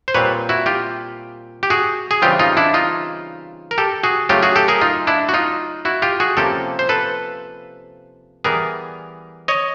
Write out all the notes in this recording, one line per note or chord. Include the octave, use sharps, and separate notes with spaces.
C5
A#2 G3 C4 B4 C#5
E4 F#4
F4 G4
G4
F#4 G#4
G#4
C#3 E3 G3 C4 F4 G4
D#4 F4
D4 E4
D#4 F4
A#4
G4 A4
F#4 G#4
C#3 F#3 A3 C#4 F4 G4
F#4 G#4
G4 A4
G#4 A#4
D#4 F4
D4 E4
F#4
D#4 F4
E4 F#4
F4 G4
F#4 G#4
C3 F3 A#3 C#4 G4 A4
C5
A4 B4
E3 G3 B3 G#4 A#4
C#5 D#5